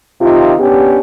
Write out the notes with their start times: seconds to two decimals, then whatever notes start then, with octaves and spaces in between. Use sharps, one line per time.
0.21 C3 D#3 D#4 F4
0.59 B3 C#4 D4 G4